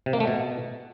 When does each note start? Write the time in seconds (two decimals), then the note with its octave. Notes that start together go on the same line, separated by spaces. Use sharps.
0.06 C3
0.13 A#3
0.20 A3
0.27 B2